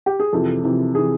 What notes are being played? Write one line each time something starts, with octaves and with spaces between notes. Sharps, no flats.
G4
G#4
F2 C3 E3 A4
F2 C3 E3
C3 E3 G#4